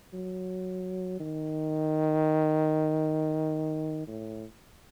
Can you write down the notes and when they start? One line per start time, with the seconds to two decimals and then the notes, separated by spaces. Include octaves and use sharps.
0.13 F#3
1.20 D#3
4.07 A2